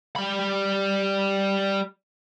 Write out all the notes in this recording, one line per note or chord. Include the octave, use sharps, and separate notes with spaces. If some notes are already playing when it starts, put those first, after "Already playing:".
G3 B5